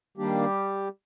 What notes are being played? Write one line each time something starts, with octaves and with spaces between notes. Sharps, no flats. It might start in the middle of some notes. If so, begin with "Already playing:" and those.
D#3 G3 A#3 D4 G4